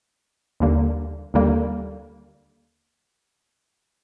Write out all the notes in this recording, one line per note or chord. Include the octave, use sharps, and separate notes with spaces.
D#2 D3 G3 A#3
D#2 D3 G3 A#3